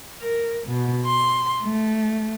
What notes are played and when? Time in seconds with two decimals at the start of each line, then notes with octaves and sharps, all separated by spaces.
0.21 A#4
0.67 B2
1.04 C6
1.63 A3